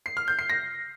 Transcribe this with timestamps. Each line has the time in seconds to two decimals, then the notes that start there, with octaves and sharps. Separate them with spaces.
0.06 C7
0.17 F6
0.28 G6
0.39 C7
0.50 A#6